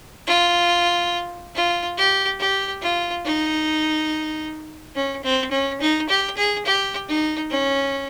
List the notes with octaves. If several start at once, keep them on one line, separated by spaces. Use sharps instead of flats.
F4
F4
G4
G4
F4
D#4
C#4
C4
C#4
D#4
G4
G#4
G4
D#4
C#4